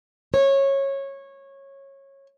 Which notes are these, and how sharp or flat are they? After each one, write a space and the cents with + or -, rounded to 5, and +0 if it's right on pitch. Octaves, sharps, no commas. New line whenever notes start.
C#5 -15